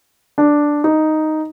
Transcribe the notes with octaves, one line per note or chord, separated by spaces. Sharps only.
D4
D#4